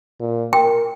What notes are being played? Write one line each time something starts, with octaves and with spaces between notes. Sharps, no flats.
A#2
A#4 G5